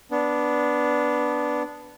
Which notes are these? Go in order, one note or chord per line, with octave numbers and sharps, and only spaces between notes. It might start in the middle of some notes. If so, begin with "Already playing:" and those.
B3 D4